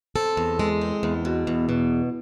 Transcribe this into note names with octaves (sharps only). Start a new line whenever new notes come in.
C4 A4
E2
G#3
C4
E2
B2
E2
B2